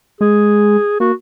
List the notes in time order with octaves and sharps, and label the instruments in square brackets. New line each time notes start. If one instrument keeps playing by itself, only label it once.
[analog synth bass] G#3 [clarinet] G#4
[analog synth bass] A#3 [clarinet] F#4